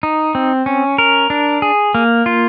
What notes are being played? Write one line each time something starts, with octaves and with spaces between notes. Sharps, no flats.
D#4
C4
C#4
A#4
D4
G#4
A#3
F4